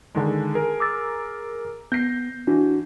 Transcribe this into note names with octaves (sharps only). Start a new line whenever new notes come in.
D3 D#3 G#3
G#4 A#4
D6 E6 A6
B3 G6 A#6 C7
E3 D4 F#4